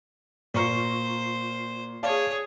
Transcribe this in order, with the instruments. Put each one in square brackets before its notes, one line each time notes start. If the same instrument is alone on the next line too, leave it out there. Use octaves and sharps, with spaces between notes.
[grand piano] A#2 A#5 G7 [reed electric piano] F4 C#6 [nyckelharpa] C5
[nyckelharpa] G#4 C#5 [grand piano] D5 F5 A5